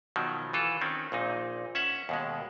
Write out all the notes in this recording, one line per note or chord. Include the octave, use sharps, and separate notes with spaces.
B2 D#3 F3 F#3
E3 F4 A4
D#3 C4 C#4
A#1 A#2 D#4
C#4 E5 F#5
D#2 B2 G#3